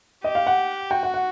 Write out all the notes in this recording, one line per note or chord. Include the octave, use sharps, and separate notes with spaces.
G4 D#5
F5
F#5
F#4 G5
F#5
F#5